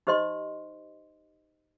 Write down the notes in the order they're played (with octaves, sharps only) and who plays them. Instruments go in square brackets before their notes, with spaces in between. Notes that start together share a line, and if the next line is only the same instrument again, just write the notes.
[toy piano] D#4 G4 C5 D#5 C6